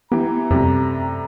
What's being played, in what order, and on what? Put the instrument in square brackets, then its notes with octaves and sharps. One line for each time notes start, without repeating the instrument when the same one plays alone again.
[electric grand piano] E3 G4 [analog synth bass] B3 [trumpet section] A#5
[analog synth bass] F#2 [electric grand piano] C3 G3 A3